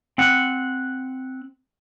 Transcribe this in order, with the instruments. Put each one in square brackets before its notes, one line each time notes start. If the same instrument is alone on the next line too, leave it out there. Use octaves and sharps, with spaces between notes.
[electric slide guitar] C4 F#5